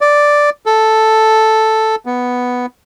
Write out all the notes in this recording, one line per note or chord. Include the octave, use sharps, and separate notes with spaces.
D5
A4
B3